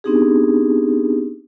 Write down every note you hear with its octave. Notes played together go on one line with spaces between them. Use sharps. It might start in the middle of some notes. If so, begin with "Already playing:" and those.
B3 C4 D4 D#4 G4 G#4